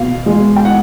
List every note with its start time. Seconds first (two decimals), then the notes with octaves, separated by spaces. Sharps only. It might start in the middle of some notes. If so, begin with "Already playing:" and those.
Already playing: B2 F5
0.26 G#3
0.56 G5
0.65 F#5